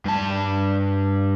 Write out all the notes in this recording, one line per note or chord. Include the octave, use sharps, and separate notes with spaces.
G2 A5